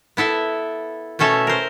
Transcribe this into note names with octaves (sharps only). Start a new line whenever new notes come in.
B3 E4 A4 E5
B2 A3 C#4 A4 E5
A#4 C5